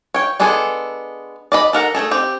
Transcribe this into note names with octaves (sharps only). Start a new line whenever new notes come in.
C#5 G5
G#3 B3 D4 G#4 A4
D5 D#5 B5
A4 A#4 F#5 A#5
A3 D#4 G#4 A4
C4 G4